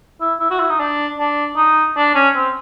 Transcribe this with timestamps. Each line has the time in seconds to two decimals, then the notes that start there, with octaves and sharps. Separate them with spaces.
0.21 E4
0.40 E4
0.51 F#4
0.60 E4
0.70 D#4
0.80 D4
1.19 D4
1.57 D#4
1.97 D4
2.15 C#4
2.36 C4